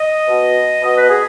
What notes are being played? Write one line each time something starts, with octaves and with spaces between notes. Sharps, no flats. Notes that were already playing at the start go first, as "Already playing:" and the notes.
Already playing: D#5
B2
B2 D#5
B4
G#4